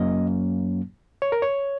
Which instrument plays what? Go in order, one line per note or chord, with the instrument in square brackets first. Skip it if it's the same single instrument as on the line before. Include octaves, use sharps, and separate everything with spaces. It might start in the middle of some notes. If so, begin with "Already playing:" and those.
Already playing: [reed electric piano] F#2 F#3 A#3 C#4 D#5
C#5
A#4
C#5